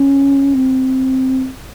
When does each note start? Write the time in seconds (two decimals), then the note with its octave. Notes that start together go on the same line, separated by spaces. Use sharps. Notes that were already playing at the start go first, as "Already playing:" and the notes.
Already playing: C#4
0.55 C4